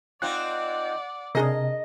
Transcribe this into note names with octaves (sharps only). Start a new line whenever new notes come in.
C4 D#4 F4 D5 F#5 F#6
C3 D4 G#4 A#4 D#5